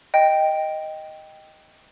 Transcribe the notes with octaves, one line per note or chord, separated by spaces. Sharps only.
D#5 G5